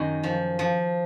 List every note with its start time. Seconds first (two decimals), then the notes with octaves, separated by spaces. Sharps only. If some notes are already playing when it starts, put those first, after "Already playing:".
Already playing: F#2 D#3 F#3
0.24 F3
0.59 F3